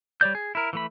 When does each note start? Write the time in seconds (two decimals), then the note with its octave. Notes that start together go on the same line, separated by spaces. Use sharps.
0.21 G3 C#5 D5 G6
0.35 G#4
0.55 E4 A#4
0.73 E3 A3 B5